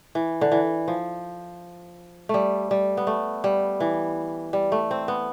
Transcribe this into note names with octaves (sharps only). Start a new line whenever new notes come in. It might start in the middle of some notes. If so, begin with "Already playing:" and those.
E3
D3
E3
F3
G3 A3
G3
B3
A3
G3
E3
G3
A3
C4
B3